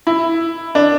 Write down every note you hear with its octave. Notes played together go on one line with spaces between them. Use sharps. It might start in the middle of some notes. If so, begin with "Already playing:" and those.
E4
D4